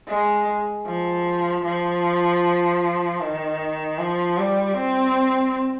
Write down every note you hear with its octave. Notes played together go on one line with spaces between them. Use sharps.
G#3
F3
F3
D#3
F3
G3
C4